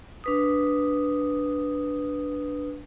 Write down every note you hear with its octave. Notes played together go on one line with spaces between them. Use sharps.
D4 B4 D#6